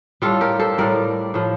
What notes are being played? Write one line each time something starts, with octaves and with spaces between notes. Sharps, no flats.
A2 G3 F4 A4
G4 A#4
A4 C5
A2 G3 A#4 D5
A2 F3